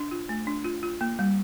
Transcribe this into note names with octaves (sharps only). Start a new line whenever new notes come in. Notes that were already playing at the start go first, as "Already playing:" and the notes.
Already playing: D4
F4
A3
D4
F4
F4
A#3
G3